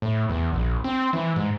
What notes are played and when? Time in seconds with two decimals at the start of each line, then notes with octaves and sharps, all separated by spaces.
0.02 A2
0.30 E2
0.53 A#1
0.84 C4
1.13 E3
1.36 G#2